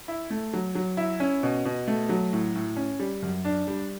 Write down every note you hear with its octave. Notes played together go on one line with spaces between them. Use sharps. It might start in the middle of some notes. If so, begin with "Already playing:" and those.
E4
A3
F#3
F#3
E4
C#4
B2
B2
A3
F#3
A2
A2
C#4
G3
F#2
D4
G3